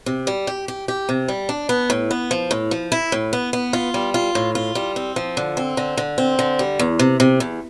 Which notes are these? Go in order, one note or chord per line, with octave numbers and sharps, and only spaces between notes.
C3
G3
G4
G4
G4
C3
G3
D4
B3
A2
B3
F3
A2
F3
E4
A2
B3
B3
F4
G3
F4
A2
F4
G3
C4
F3
D3
C4
D3
D3
C4
D3
G3
E2
C3
C3
E2